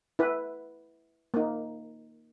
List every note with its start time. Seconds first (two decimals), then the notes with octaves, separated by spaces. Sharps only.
0.19 E4 B4
1.34 A#3 D#4